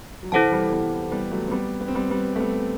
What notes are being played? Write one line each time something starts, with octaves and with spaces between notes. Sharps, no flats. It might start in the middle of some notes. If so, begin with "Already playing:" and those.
F#3
C3 E3 E4 A4 C5 F#5 A5
E3 G3
G3 B3
G3 B3
F#3 A3
C4
G3 B3
B3
C4
G3 B3
G3 B3
A3
G3 B3